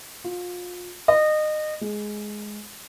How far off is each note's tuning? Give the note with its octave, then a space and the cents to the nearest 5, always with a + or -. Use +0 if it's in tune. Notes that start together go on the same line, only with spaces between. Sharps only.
F4 +30
D#5 -25
G#3 +10